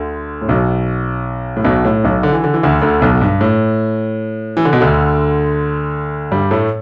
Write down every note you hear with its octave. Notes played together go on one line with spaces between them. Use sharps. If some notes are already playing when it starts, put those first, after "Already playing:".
Already playing: D2 D3
A2
B1 B2
A2
B1 B2
A2
B1 B2
D3
E3
D3
E3
D2 D3
D2 D3
B1 B2
G2
A2
E3
D3
B2
D2 D3
G2 G3
A2 A3